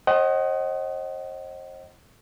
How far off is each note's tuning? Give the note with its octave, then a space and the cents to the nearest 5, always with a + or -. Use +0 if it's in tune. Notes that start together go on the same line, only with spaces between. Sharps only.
C5 +40 D#5 +0 F#5 +35